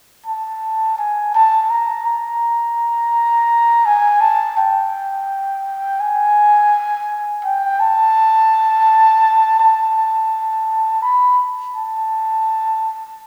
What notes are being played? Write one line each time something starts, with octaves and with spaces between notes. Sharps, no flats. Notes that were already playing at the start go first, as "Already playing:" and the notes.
A5
G#5
A5
A#5
A#5
G#5
A5
G5
G#5
G5
A5
A5
B5
A5